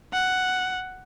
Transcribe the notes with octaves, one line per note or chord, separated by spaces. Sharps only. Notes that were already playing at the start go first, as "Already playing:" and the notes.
F#5